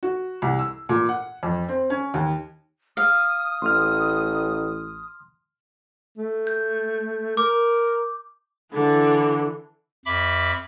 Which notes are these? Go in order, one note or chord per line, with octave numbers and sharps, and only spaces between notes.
F#4
C2
E6
A#2
F#5
F2
C4
C#4
D#2
F5 D#6
A1 C6 F6
A3
G6
A#4 D6
D3 E3
F2 E5 B5 D6